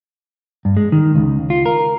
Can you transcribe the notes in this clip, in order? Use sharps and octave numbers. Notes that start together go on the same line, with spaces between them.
G2
G#3
D#3
C#2
F4
A#4